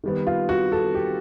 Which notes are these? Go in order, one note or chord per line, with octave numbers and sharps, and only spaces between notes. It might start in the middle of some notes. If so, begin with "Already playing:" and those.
D#3 G3 B3
F4
F#4
A4
G4